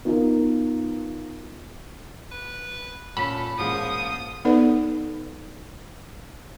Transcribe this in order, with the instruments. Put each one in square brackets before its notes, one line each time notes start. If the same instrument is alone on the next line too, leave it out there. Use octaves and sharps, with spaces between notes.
[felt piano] B3 D#4 F4 A#4
[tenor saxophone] B4
[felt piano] A#2 C#4 [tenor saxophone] A4 [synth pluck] B5
[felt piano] A1 G#3 A#3 [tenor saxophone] F3 [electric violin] D#6
[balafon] B3 D#4 A4 B4 D5